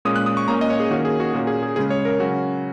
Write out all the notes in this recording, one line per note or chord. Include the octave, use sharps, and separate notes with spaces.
A#2 G#3 C#4 D#6
F#6
D#6
C#6
A#2 A#3 C#4 A#5
D#5
C#5
G#4
D#3 A#3 C#4 F#4
G#4
F#4
A#2 A#3 C#4 F#4
G#4
G#4
C#3 G#3 C#4 G#4
C#5
A#4
C#3 F#3 C#4 F#4